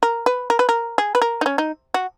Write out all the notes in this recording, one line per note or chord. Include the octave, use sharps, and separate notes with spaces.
A#4
B4
A#4
B4
A#4
G#4
B4
A#4
D#4
C#4
D#4
F#4